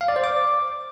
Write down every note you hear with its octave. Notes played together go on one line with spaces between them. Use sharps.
F5
D5
C5
D6